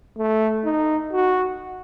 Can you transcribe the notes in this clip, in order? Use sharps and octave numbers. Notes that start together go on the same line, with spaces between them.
A3
D#4
F#4